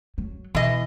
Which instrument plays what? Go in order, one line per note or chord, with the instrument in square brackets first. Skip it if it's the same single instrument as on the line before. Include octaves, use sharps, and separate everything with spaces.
[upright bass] F#3
[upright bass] B2 [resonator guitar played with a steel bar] E3 D#5